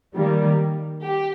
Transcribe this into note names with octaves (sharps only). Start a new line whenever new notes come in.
D#3 G3 A#3
G4